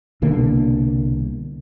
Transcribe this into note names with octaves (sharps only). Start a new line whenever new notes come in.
C2 B2 D3 A#3